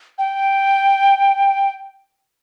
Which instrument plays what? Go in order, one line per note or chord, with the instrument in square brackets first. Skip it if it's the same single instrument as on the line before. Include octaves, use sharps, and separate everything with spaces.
[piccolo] G5